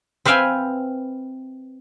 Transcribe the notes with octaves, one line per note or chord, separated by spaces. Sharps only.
C4 B4 E5 F5 G5 G#5